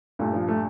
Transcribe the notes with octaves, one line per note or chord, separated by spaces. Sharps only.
G2 A#2 A3
F3
A3